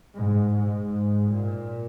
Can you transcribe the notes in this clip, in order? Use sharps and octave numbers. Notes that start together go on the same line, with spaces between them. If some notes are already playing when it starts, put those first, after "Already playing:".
G#2
G#2
A#2